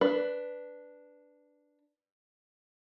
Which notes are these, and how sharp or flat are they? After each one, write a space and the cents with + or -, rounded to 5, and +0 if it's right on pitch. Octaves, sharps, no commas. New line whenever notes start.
D4 +0 B4 +5